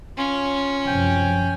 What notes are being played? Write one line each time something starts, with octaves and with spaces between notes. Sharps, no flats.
C#4 F4
F#2 C3 F3 G5 G#5